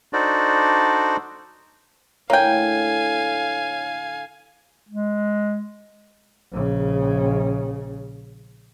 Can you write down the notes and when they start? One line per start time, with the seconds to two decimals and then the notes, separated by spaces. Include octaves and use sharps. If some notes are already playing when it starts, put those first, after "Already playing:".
0.13 D4 D#4 F#4 A4 C5 D5
2.30 A2 D3 A#3 C#5 F5 G5 G#5 B5
4.89 G#3
6.52 A#1 C#3